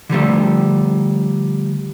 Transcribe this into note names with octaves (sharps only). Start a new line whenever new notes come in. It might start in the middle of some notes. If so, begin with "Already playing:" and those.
D3 F3 G3 A3